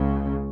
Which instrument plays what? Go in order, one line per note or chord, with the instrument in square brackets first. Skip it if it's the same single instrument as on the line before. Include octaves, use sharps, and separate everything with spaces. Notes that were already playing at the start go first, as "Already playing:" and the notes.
Already playing: [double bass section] C#2 C#3